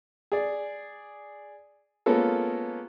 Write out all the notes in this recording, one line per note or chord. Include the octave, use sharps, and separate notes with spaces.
G#4 D5
G#3 A#3 B3 C#4 F4 A4